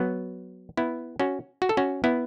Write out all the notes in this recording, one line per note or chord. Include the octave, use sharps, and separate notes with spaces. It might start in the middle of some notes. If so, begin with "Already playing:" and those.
Already playing: F#3 B3
B3 E4
C#4 F#4
F#4
A4
C#4 F#4
B3 E4